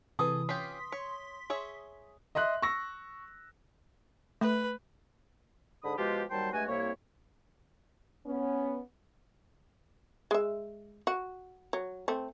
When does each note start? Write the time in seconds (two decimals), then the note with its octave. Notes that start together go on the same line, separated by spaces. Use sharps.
0.19 C3 E3 G#4 A4 B4 D#6
0.49 C#4 F4 G4 C6 B6
0.92 C#5
1.50 G#4 C#5 E5
2.35 D#5 E5 C6 F#6
2.62 C#6 E6 A#6
4.41 A3 B4
5.83 G#2 D3 B5 D#6
5.97 B2 F3 G#3 F4 G4
6.31 D#2 F#3 G3 C5 G5 A5
6.53 G2 G#3 A3 F#4 G#5
6.68 C2 C3 A#3 E4 C#5
8.25 B3 C#4
10.31 G#3 E5
11.07 F#4
11.73 F#3
12.08 A3 C4